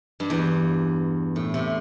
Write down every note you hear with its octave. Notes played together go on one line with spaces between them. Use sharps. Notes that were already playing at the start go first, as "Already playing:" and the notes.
G2
E2
A2
C3